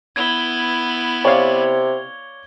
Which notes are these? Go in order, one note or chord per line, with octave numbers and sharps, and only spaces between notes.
B3 E4 G#6 G7
C3 C#5 D5 F5